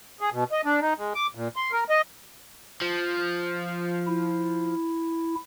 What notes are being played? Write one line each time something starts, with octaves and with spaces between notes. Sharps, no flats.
G#4
B2
D#5
D4
D#4
G#3
D6
A#2
C6
A#4
D#5
F3
E4